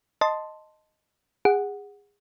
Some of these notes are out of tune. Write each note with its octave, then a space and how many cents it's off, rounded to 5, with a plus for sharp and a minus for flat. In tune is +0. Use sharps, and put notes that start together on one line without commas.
D#5 +0 A5 +5 C6 +0
G#4 -25 F#5 +0